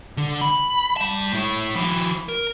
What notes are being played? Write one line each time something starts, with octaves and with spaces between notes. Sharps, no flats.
D3
B5
G3 A5
A2 E4
F3 E4
A#4